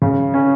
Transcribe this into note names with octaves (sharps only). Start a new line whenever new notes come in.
C#3
C#4